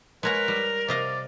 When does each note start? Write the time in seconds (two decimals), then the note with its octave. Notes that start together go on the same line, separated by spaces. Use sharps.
0.23 G#3 A#4 B4 C#5 F#5
0.48 G3
0.88 C3 D5 D#5 F5